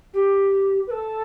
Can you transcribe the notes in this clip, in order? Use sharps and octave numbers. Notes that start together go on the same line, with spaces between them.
G4
B4
A4